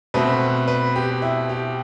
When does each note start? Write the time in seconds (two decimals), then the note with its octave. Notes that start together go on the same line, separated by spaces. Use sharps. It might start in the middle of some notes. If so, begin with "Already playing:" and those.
0.14 B2 A3 C4 B4
0.68 B4
0.96 G4
1.22 E4
1.49 G4